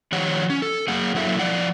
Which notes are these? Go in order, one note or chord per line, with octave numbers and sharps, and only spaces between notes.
D#3 F3 G4 C#5 F#5
C#4
A4
F#3 A#3 G#4 F#5
F#3 A#3 E4 A4 E5
F3 D5 F#5